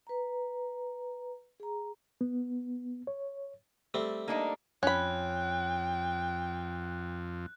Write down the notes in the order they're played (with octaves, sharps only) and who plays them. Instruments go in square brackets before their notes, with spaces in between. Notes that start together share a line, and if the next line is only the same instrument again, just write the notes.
[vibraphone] B4 A#5
G#4 A#5
[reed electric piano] B3
C#5
[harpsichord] G3 A3 C4
[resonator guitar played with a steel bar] A#3 D4 D#4
[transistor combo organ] F2 [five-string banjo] C#4 B5 [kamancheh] G5 [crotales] F#6